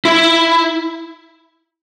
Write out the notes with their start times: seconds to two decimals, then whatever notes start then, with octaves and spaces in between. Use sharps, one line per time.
0.05 E4